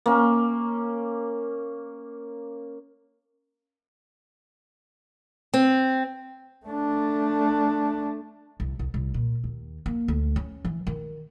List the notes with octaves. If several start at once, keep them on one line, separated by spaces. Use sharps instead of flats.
A#3 C#4
C4
A3 D4
C2
C2
C2
A#2
D#2
A#3
D2
C#4
E3
D#3